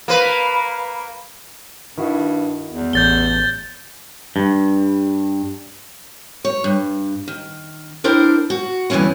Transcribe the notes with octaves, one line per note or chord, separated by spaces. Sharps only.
A#3 B4
G2 D#3 E4 F#4
E2
A1 C#5 G6 A6 G7
G2
C#5
G2
D#3
D4 E4 A#4 C5 G5
F#4
E2 G2 D3 E3 C#4 E4